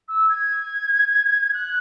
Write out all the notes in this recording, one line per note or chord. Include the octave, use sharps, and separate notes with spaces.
E6
G#6
F#6